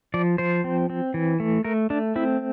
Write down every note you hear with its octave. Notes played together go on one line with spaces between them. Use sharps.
F3 D5
F3 C5
C4
C4
E3
A3
A3 A#4
A3 D4
C4 E4